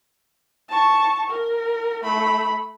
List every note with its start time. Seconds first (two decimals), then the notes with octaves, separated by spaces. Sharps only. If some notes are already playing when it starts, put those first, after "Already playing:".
0.69 A5 C#6
1.30 A#4
2.04 A3 B5